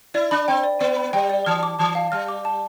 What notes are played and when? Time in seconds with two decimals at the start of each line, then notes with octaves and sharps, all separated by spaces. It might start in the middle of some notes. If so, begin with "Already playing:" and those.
0.14 E4 D5
0.31 D4 B5
0.48 C4 G5
0.64 D5
0.80 B3 D5
0.96 B5
1.13 G3 G5
1.30 D5
1.46 E3 F6
1.63 D6
1.79 E3 A5
1.95 F5
2.12 G3 F6
2.28 D6
2.45 A5